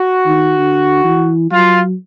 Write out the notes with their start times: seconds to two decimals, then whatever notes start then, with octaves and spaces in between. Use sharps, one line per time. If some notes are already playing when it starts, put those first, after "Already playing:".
Already playing: F#4
0.26 D#3
0.57 D3
1.04 E3
1.52 F#3 F4